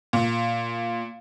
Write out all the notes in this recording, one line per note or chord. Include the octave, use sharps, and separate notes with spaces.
A#2